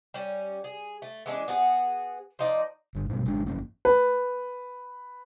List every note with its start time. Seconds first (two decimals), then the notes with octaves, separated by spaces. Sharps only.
0.14 G3 C#4
0.64 G#4
1.02 A3
1.26 E3 G#3 C#4 D4
1.48 B3 F#4 G#4
2.39 F3 D#4 D5
2.95 G1
3.09 G#2 B2 G3 B3
3.26 G#1 G#3 D4
3.46 G1 F2 A#3 C#4
3.85 B4